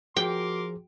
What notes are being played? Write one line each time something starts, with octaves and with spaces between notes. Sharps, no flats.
F3 F#4 G#4 A#4 G5 C6 D6